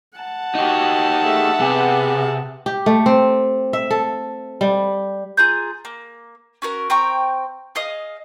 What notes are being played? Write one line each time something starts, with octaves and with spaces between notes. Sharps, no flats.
F#5 A5
D#4 F#4 G4
A3 G#4 E5
C3 B3 G#4
G4
A3
C4
E5
A4
G3
F4 G#4 A#5 G6
A#3
C#4 F#4 A#4
C4 G5 A#5 C#6
G#4 D#5 F5 D#6